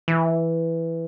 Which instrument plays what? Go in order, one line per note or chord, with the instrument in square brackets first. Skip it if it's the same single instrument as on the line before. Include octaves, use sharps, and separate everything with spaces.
[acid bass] E3